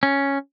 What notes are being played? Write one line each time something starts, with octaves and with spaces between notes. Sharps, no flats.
C#4